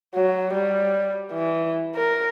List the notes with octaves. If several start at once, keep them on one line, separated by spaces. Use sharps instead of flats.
F#3
G3
E3
A#4